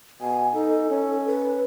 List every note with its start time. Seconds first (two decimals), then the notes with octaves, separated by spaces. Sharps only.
0.21 B2 G#5
0.53 D#4 A4
0.91 C#4
1.27 B4